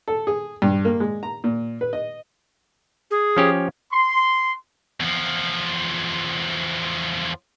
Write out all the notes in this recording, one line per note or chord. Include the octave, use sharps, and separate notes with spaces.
A4
G#4
G2
A#3
G#3
A#5
A#2
B4
D#5
G#4
F3 C#4 G4
C6
E2 F3